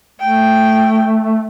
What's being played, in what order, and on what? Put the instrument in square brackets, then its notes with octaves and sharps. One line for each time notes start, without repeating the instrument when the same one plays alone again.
[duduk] A3 [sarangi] G5